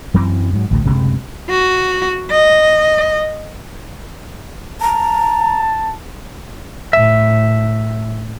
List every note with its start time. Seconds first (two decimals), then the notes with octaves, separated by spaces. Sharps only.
0.14 F#2 E3 F#3 C4
0.53 G#2 F#3
0.71 A1 D2 A#2
0.85 F#1 D2 C3 G#3
1.50 F#4
2.31 D#5
4.81 A5 A#5
6.93 A2 E5